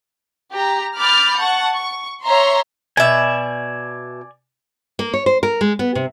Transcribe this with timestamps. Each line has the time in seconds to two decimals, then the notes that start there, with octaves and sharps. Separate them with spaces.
0.53 G4 A#5
0.98 B5 D6 F6 G6 A6
1.41 F#5 A5 C#6
1.75 C#6
2.25 C#5 E5 A#5 C6
2.97 B2 D5 E5 G#5
4.99 A#3
5.14 C#5
5.26 C5
5.43 A#4
5.61 G#3
5.79 B3
5.95 C3